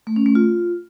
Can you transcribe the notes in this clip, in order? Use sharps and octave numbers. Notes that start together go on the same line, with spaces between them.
A3
C#4
A3
F4